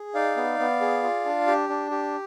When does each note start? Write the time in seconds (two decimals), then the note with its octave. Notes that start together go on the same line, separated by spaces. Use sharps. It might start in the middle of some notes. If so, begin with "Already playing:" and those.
Already playing: G#4
0.14 D#4 D5 F5
0.37 B3
0.59 B3
0.81 G#4
1.03 F4
1.25 D4
1.47 G4
1.69 D4
1.91 G4